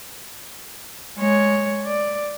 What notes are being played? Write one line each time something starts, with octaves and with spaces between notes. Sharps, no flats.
G#3 C#5
D5